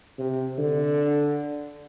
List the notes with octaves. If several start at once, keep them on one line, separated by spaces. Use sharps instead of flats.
C3
D3